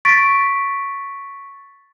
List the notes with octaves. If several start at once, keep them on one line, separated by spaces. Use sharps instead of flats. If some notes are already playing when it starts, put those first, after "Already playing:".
C#6 A6 B6 D7